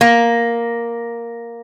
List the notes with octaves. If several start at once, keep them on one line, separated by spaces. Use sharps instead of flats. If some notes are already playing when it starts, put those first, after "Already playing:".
A#3